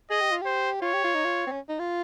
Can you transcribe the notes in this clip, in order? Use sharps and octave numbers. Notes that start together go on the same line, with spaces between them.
G#4 D#5
G4
F4
G4 C5
F4 C#5
G4
F4
D#4
F4
C4
C#4
D#4
F4